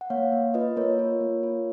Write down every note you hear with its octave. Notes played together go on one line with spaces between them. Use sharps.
F#5
A#3 C#5 F5
A#3
F4 B4 D#5
A#3 A#4 C#5
F4
A#3
F4